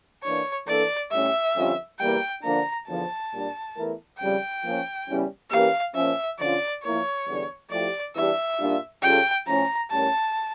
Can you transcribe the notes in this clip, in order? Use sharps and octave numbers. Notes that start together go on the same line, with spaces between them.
E3 A#3 D4 C#5
E3 A#3 D4 A4 D5
A2 G3 C#4 G4 E5
F2 D3 G3 C#4 F4
E2 E3 G3 A#3 G5
D3 F3 A#3 D4 A#5
E2 D3 F3 A5
A#2 G3 D4
E2 E3 A3 E4 A#4
F2 C#3 G3 G5
F3 A#3 C#4
E2 C#3 E3 G3 C#4
E3 A#3 C#4 G4 A#4 F5
A#2 F3 C#4 E5
D3 F3 C#4 F4 D5
F3 A#3 E4 A#4 C#5
E2 D3 G3 D4
F3 A3 E4 G4 D5
E2 E3 G3 D4 G4 E5
A#2 G3 D4 F4
C#3 G3 C#4 F4 A4 G5
A2 F3 C#4 A#5
A2 G3 C#4 G4 A#4 A5